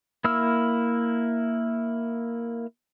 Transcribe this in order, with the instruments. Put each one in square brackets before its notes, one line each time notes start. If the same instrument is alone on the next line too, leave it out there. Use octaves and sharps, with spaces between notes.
[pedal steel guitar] A#3 E4 E6 F6